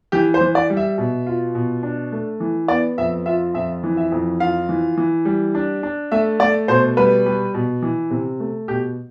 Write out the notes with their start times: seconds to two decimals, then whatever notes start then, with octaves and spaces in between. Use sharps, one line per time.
0.12 E3 G4
0.34 C5
0.41 E3
0.55 D5
0.70 G3
0.77 E5
0.98 B2
1.27 F4
1.55 B2
1.83 D4
2.12 A3
2.40 E3
2.68 B3 D5
2.98 F2 E5
3.26 F4 E5
3.54 F2 E5
3.83 E3
3.97 E5
4.12 F2
4.40 F4 F5
4.69 E3
4.97 E3
5.25 G3
5.55 D4
5.83 D4
6.12 A3 E5
6.40 A3 D5
6.68 B2 C5
6.97 G3 B4
7.26 G3
7.54 B2
7.82 E3
8.10 C3
8.40 A3
8.68 B2 G4